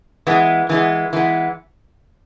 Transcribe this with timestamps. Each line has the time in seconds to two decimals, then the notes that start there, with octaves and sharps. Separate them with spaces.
0.27 E3 G#3 B3
0.70 E3 G#3 B3
1.13 E3 G#3 B3